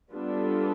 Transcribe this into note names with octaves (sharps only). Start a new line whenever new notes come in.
G3 B3 D4 F4 A4